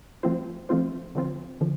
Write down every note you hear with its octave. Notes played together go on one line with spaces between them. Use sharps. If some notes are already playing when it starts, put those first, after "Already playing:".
F3 A3 C4 F4 C5
F3 A3 C4 F4 C5
D3 F3 C4 F4
D3 F3